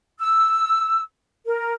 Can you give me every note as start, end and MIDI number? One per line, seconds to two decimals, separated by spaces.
0.20 1.01 88
1.46 1.73 70